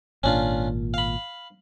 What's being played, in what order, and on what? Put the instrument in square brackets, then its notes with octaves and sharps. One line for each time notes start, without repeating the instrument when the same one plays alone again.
[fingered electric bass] G#1 A#2 [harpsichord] C#4 D4 F4
[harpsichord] F5 B5